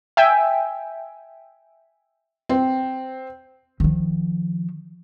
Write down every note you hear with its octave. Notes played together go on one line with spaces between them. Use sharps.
E5 G5 G#5
C4
D#3 F3